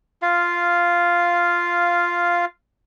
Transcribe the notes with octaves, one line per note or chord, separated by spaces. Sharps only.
F4 F5